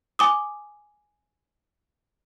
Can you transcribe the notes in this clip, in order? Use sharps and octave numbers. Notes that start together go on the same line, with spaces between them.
G#5 D6 D#6